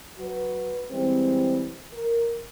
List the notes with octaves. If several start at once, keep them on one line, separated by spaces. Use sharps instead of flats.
F#3 F#4 B4
E3 G3 G#3 C4
A#4